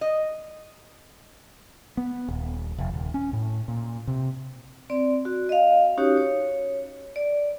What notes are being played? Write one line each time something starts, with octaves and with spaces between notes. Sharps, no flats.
D#5
B3
D#1
F1
D#1
C#4
A2
A#2
C3
C4 D5
F#4
D#5 F5
C#4 D#4 F#4 G4 C#5
C#5
D5